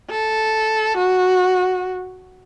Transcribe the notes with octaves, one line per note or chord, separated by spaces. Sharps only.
A4
F#4